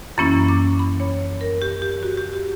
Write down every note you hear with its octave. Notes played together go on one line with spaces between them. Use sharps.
F#2 E3 A#3 C#4 E4 B5
D6
B5
C#5
A#4
G4
G4
F#4
G4
G4